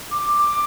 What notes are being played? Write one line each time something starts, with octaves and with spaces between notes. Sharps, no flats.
D6
D6